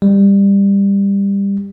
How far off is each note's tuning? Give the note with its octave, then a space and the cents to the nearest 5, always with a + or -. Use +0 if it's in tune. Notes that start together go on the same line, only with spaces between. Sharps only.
G3 +20